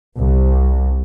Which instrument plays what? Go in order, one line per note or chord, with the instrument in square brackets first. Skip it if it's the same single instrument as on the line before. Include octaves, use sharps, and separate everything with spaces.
[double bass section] C2